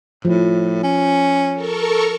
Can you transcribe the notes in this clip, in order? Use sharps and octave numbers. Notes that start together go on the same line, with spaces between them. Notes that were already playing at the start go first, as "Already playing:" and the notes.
A2 F3
C#4
A4 A#4 C#6